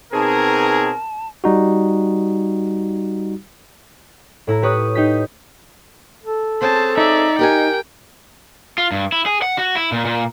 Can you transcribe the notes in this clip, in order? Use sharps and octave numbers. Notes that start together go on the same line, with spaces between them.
B2 C4 D#4 G#4 A#4 A5
G3 D#4 F#4
A2 E4 A#5
G4 B4 C#5 D#6 F#6
D#4 G4 B6
A4
C4 C#4 G#4 C5 A5
D#4 D5 E5
G4 A#4 G5 G#5
F4
G2
E4
G#4
F#5
F#4
E4
A#2
A#2